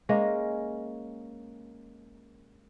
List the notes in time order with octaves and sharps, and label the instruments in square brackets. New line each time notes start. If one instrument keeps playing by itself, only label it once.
[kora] G#3 A#3 C#4